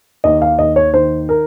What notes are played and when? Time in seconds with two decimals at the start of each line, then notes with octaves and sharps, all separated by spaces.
0.24 D#2 D#5
0.42 F5
0.59 D#2 D#5
0.76 C#5
0.93 D#3 C5
1.29 A#4